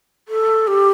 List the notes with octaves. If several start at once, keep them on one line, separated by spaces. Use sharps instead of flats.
A4
G4